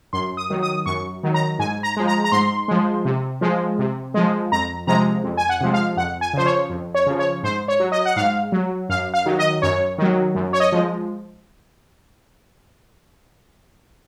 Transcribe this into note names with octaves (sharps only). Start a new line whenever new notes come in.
F#2 C6
D#6
D#3 F#3
D#6
F#2 C#6
D#3 F#3
A#5
G#2 G#5
A#5
F3 G#3
A#5
A#5
G#2 C6
F3 G#3
C3
F3 G#3
C3
F3 G#3
F2 A#5
C3 F3 G#3 A#5
F2
G#5
F#5
C3 F3 G#3
F5
F2 F#5
G#5
C#3 F3 C5
C#5
F2
C#5
C#3 F3
C#5
G#2 C5
C#5
F#3
D#5
F#5
G#2 F5
F#3
F#2 F5
F5
D#3 F#3
D#5
F#2 C#5
D#3 F#3
F#2
C#5
D#5
F3 G#3